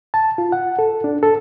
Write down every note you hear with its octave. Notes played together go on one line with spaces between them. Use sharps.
A5
F4
F#5
A4
D4
A4